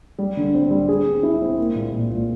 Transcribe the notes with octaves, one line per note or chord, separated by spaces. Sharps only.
G3
D3
C4
G3
G#4
C4
E4
C4
A#3
A#2
A#2
A#2